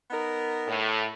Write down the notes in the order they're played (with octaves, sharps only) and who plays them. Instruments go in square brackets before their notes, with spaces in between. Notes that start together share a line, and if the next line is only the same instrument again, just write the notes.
[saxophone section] B3 D#4 A#4
[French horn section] A2